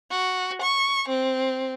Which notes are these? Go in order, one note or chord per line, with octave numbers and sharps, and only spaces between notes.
F#4
C#6
C4